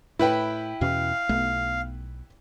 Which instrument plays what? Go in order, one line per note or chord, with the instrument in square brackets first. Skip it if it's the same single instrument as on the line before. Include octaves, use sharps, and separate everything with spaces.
[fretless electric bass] A2 [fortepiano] E4 B4 G5
[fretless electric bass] E2 B2 C#4 [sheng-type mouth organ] F5
[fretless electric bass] B1 A3 B3